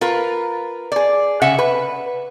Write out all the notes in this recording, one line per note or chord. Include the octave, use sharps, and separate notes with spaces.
F4 A#4 B4
G#4 D5
C#3 E5 F#5
B4